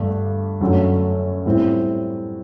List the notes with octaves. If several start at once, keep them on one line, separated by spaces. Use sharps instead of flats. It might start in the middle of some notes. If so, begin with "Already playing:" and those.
Already playing: G2 D3 A3 D4
F#2 D3 F#3 A3
A2 G3 C4